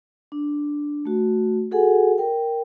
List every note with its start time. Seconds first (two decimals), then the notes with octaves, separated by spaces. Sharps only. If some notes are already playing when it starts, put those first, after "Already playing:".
0.32 D4
1.05 A3 F#4
1.71 F#4 G#4 A4 F#5 G#5
2.18 A#4 G5